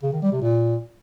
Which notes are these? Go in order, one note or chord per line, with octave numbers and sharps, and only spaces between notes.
C#3
D#3
G3
C3
A#2